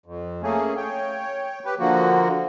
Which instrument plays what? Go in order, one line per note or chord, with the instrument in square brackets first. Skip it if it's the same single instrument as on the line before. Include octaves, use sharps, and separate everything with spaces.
[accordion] F2
A3 A#3 C#4 G#4
C#5 G5
G4 B4
D3 F3 A#3 F#4